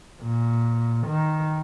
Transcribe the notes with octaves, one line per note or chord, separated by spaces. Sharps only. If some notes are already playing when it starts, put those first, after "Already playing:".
A#2
D#3